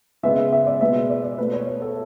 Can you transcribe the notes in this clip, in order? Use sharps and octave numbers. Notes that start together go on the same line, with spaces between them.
C#3 G#3 B3 E5
E5
D5
B2 G#3 B3 E5
D5
D5
B2 A3 B4
C#5
B4
A4